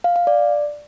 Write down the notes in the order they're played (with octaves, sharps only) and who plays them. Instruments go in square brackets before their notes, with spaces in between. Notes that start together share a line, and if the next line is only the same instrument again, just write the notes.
[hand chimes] F5
F5
D5